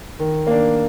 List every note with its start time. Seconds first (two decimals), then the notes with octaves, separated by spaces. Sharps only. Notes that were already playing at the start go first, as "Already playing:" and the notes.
0.20 D#3
0.47 A#3 D4